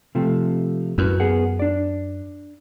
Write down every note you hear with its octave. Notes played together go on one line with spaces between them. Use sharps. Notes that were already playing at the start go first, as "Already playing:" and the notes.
C3 F3 A3
F#2 E4 F#4 B4
B3 G#4 F#5
D4 D5